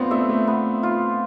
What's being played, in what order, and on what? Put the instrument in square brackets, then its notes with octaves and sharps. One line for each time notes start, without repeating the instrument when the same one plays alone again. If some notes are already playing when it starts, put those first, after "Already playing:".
Already playing: [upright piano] A3 B3 C4 [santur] D4 F4
[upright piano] A3 [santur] E5
[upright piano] A3
[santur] B3
F4